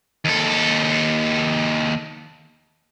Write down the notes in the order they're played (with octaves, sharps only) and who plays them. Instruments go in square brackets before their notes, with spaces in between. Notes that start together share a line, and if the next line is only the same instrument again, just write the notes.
[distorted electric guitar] D#2 A4